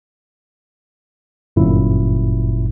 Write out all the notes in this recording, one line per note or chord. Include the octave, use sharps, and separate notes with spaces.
G1 F#2 A#2 E4